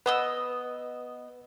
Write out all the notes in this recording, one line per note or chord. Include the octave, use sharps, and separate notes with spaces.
B3 B4 D#5 E6